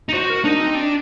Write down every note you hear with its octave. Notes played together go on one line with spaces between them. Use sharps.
D#4
F#4 C5
A#4
D4 D#4
C4
D4